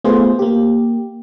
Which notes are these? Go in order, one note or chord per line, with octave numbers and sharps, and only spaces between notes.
A3 B3 F4 G#4 C5
A#3 G4